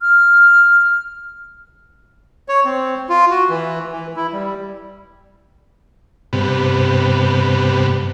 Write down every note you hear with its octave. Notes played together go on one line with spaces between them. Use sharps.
F6
C#5
C4
F4
F#4
E3
E3
E4
G3
G2 C3 B3